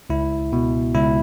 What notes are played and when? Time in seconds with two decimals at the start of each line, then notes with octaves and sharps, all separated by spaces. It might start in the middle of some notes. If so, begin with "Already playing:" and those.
0.10 C#2 E4
0.53 B2
0.95 C#2 E4